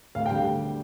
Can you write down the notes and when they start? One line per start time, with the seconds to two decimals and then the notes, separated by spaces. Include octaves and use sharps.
0.15 D2 F5
0.26 G5
0.31 D3 G3